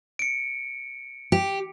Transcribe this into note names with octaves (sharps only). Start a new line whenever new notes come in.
C#7 D7
G4